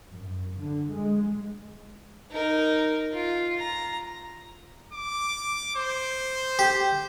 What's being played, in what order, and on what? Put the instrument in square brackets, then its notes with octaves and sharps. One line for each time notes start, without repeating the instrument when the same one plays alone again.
[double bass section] F#2
D3
G#3
[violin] D#4 A#4
F4
A#5
[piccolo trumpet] D6
C5
[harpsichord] G4